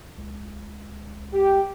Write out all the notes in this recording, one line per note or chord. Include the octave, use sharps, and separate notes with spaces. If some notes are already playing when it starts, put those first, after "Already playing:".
C#2
G4